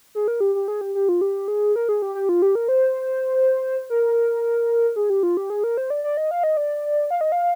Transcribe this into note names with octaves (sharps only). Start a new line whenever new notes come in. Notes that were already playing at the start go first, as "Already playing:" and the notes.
G#4
A#4
G4
G4
G#4
G4
G4
F4
G4
G#4
A#4
G#4
G4
G4
F4
G4
A#4
C5
A#4
G#4
G4
F4
G4
G#4
A#4
C5
D5
D5
D#5
F5
D#5
D5
F5
D#5
F5